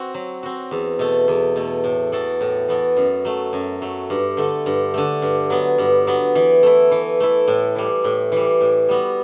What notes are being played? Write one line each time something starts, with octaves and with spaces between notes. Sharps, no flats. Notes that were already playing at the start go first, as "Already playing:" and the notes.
Already playing: C4 F#4
F#3
C4 F#4
E2
B2 A3
E2
B2 A3
A2
E3 B3 F#4 A4
A2
E3 B3 F#4 A4
F#2
F#3 A3
F#2
F#3 A3
G2
D3 A3
G2
D3 A3
G2
F#3 B3
G2
F#3 B3
E3
A3 E4
E3
A3 E4
A2
E3 G3
A2
E3 G3
A2
G3 B3 F#4